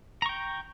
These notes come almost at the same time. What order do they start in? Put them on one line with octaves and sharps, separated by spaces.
A#5 C#6 G5